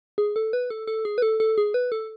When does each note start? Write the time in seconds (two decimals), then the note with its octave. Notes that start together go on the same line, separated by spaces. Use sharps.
0.18 G#4
0.36 A4
0.53 B4
0.70 A4
0.87 A4
1.05 G#4
1.18 B4
1.22 A4
1.40 A4
1.58 G#4
1.74 B4
1.92 A4